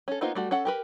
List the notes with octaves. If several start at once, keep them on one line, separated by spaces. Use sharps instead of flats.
C#4 A4
A#3 B3 D#4 F4 C5
G3 A3 F#4
C#4 A4 F#5
G4 A#4 B4